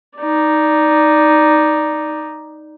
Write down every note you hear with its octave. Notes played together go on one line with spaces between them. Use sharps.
D#4 D5